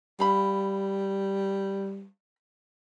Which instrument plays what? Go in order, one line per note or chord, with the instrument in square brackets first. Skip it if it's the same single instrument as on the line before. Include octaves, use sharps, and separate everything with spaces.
[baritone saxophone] G3 [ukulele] F5 B5